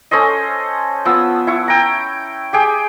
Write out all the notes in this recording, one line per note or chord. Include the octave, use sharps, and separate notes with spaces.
C#4 A4 C5 D#5
F3 B3 E6
E4 C#6
G5 A#5
G4 G#4 G5